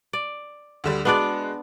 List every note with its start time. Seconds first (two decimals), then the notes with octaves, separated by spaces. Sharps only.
0.13 D5
0.84 D2 D3 G3
1.05 G#3 B3 D4 F#4 D5